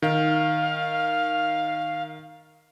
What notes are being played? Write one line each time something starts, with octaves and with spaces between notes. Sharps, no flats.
D#3 F5